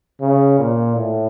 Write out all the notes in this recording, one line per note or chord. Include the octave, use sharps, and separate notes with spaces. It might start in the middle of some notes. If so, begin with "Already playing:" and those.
C#3
A#2
A2